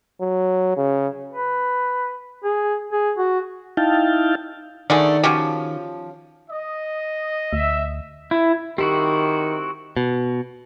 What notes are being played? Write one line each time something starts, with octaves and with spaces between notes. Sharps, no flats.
F#3
C#3
B4
G#4
G#4
F#4
D#4 E4 F5 G5 A5
D3 D#3 A3 G#4 D5 F#5
F3 C#4 F#4 G4
D#5
D2 E5
E4
D#3 C4 E4 F#4 G4
B2